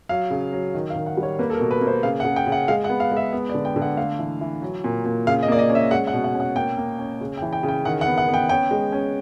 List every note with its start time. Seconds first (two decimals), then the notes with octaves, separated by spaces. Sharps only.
0.09 F#3 F5
0.30 C#3
0.53 F#3
0.74 D#3
0.90 F5
0.96 D#3
1.06 F#5
1.17 G3
1.23 C#5
1.39 A#3 B4
1.50 A4
1.55 A#4
1.60 B2
1.71 B4
1.81 A#3
1.87 C5
2.03 C#3 F5
2.20 F#5
2.24 C#3
2.36 G5
2.47 C#3
2.52 F#5
2.68 G#3 F5
2.84 F#5
2.90 B3
3.00 F5
3.11 G#3
3.17 E5
3.33 B3
3.49 D5
3.54 D3
3.65 G5
3.76 D3
3.82 F#5
3.97 A3 F5
4.19 E3
4.41 E3
4.62 F#3
4.84 A#2
5.06 A#2
5.27 C#3 F5
5.43 D#5
5.48 A#3 D5
5.59 D#5
5.70 C#4
5.75 E5
5.91 G#3 F#5
6.07 F#5
6.13 B2
6.24 F#5
6.35 C#4
6.40 F#5
6.56 A#3 G5
6.78 A#3
6.98 C#4
7.21 C#3
7.37 G5
7.42 E3
7.53 G5
7.63 C#3
7.68 G5
7.85 D#3 F#5
8.01 F#5
8.06 B3
8.18 F#5
8.28 B3
8.34 G5
8.49 C#4 G5
8.71 G#3
8.92 C#4